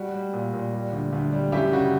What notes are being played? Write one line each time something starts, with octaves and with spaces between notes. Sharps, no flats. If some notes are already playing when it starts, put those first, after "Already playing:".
Already playing: G3 F#4
G3
A#2
A#2
G3
D2
D2
G3
F#2 E4 G4
C#3 F#4